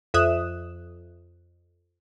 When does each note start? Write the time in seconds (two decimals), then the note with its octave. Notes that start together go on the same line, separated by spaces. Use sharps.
0.14 F2 E5 D#6 F#6 E7